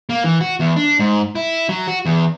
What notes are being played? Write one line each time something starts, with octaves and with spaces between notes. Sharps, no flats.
A#3
E3
F#4
E2
D4
G#2
E4
F#3
F#4
E2